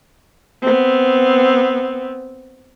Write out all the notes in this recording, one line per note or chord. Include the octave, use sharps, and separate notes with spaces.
B3 C4